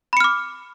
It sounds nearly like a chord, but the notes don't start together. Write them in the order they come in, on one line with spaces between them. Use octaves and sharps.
B5 C#7 F6 D6